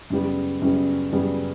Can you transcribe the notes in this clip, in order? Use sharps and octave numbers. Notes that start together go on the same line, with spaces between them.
F#2 C#3 G3 B3
F#2 C#3 G3 B3
F#2 C#3 G3 B3